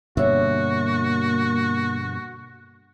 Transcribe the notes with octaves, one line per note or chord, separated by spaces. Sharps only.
G2 B2 D3 A#3 F#4 C#5 E5